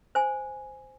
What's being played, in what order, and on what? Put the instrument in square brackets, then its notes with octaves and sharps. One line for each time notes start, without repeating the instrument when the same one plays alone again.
[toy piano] C5 G#5